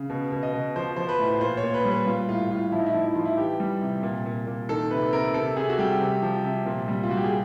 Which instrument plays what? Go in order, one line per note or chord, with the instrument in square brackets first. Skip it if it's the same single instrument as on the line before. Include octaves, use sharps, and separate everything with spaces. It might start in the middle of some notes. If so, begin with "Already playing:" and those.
Already playing: [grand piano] C#3
B2
B2
D#5
B2
F3 C5
F3 C5
B4
A2
A#2 C5
C#5
A#2
B4
G3
B4
G3 F4
A2 F4
A2 F4
F3 E4
D#4
E4
F3
E4
F3 F4
E4
E3 G4
G3
C3
A#2
A#2
A#2
D#3 A4
C3 B4
C3 A#4
C3 A4
C3 G#4
F#4
G3 G4
C3
F3
C3
A#2
G3
F4
G3 F#4
G4
G#4